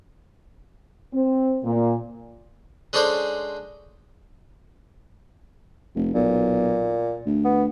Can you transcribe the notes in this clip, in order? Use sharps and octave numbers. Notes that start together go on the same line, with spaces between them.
C4
A#2
G#3 C#4 D4 A4 C5 D5
F1
B1 A#2
D2
B3